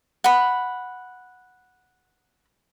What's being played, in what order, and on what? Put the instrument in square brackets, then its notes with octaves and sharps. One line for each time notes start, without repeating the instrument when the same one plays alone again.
[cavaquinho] F#5 B5